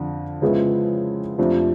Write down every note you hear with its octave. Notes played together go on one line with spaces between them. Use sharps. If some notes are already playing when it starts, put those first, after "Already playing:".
Already playing: F2 D3
C#3 F3 G#3 B3 E4
F2 C3 F3 A3 D4